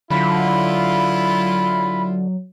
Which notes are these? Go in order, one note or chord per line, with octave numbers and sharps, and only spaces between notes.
D3 F#3 E4 F4 B5